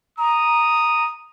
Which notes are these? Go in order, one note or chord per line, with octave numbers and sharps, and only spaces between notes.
A#5 D#6